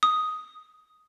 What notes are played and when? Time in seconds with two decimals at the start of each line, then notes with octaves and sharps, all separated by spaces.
0.03 D#6